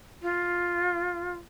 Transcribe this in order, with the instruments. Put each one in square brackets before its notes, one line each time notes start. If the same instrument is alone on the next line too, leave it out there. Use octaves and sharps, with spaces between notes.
[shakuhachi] F4